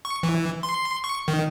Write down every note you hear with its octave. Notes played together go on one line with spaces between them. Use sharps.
C#6
E3
C6
C#6
D#3